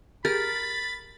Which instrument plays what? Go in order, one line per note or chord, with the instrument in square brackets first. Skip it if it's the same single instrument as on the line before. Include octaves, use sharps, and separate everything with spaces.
[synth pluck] G4 G#4 [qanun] A#4 [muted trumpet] B5 [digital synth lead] A6